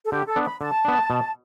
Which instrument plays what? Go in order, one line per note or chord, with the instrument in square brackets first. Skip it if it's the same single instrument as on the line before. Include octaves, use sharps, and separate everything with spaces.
[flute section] A4
[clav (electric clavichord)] D3 [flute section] G4
[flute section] A4
[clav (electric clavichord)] B3 D4
[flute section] B5
[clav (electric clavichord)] D3 [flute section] A5
[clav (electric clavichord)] B3 D4
B2